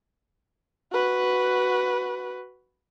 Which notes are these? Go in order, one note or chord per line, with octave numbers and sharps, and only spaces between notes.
F#4 B4